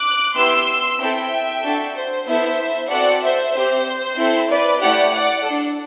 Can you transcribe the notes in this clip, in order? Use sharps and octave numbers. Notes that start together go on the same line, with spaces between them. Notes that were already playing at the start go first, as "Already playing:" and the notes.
Already playing: D6 F#6
B3 E4 G4 C6 E6
C4 E4 A4 E5 G5
D4 F#4 A4
C5
B3 E4 A4 C5 E5
C4 F#4 A4 D5 F#5
C5 E5
C4 G4 C5
C4 E4 A4
B4 D5
A3 E4 G4 D5 F#5
D5 F#5
D4 A4